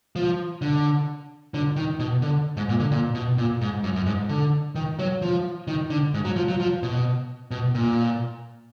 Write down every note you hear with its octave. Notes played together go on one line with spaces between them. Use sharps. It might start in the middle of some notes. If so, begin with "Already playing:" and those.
F3
D3
D3
D#3
B2
D3
G#2
A#2
D3
A#2
B2
A#2
G#2
F#2
F#2
G#2
D3
D#3
F#3
F3
D#3
D3
G#2
F#3
F3
F#3
F3
B2
B2
A#2